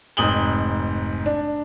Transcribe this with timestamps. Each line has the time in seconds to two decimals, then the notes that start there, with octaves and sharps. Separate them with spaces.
0.17 F1 G#2 D#6 F#7 G7
1.26 D4